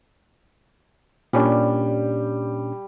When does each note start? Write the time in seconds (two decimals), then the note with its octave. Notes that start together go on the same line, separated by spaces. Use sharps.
1.33 A#2 G3 C#4 D4